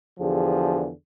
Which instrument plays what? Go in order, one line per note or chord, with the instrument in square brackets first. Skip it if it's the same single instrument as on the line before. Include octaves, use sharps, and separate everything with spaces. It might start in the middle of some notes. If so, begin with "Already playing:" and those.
[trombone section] E2 D3 F3 G4 G#4